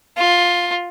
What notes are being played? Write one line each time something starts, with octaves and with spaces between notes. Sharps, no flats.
F4